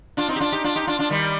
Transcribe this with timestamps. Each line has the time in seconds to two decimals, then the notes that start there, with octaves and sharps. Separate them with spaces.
0.17 D4 F4
0.28 C4 D#4
0.36 G4
0.40 D4 F4
0.52 D#4 G4
0.64 D4 F4
0.76 D#4 G4
0.87 D4 F4
0.99 D4 F4
1.10 D#3 G3